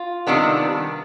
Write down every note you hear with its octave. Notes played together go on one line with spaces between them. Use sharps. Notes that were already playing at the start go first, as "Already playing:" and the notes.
Already playing: F4
C3 D#3 G3 B3 D4